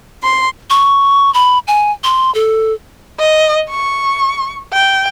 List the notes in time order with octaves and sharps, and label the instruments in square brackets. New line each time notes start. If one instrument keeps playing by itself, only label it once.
[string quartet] C6
[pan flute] C#6
B5
G#5
C6
A4
[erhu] D#5
C#6
G5